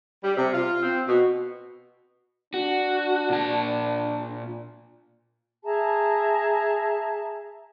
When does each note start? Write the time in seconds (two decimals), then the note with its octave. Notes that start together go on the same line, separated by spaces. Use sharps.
0.24 G3
0.37 C3
0.53 F4
0.83 C4
1.07 B2
2.54 D4 F#4
3.30 A#2 A5
5.64 G#4 E5 A5 A#5